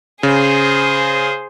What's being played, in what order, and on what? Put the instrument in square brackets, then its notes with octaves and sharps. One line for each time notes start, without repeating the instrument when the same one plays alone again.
[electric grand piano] C#3 [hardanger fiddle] G#4 C5